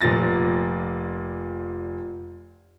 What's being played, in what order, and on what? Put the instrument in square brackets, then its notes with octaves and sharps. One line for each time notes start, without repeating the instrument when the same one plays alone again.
[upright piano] F1 A#2 F3 A6 A#6